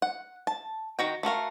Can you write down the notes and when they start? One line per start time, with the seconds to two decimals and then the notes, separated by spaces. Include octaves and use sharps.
0.02 F#5
0.47 A5
0.99 D#3 F#4 G5
1.23 A3 F#4 A#4 F5